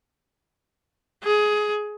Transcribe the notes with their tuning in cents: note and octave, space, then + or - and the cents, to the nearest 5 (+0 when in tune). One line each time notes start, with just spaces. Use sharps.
G#4 +15